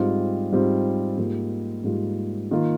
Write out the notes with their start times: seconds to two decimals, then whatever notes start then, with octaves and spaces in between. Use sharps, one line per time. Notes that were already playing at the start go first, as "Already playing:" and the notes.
Already playing: G#2 G3 C4 F4
0.52 G#2 G3 C4 F4
1.17 G#2 G3 A#3 F4
1.84 G#2 G3 A#3 F4
2.51 D#3 A#3 F4